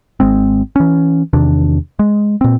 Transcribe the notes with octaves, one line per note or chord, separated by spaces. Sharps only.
G#1 G#3 C4
E3 C#4
E2 C3 D#3 D4
G#3
A#2 C4